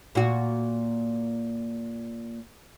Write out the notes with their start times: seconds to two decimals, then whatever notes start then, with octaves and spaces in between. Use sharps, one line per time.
0.15 A#2 F#4